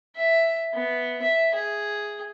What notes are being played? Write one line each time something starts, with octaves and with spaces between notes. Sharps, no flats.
E5
B3
E5
G#4